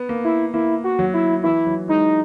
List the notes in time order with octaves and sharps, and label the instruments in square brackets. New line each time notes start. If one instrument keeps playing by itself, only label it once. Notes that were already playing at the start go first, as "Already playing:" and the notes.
Already playing: [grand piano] B3
A#3
[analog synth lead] E4
[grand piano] A#3 [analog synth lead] E4
[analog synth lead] F#4
[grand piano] F#3
[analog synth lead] E4
[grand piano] E3 [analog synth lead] E4
[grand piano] F#3
[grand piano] G#3 [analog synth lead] D#4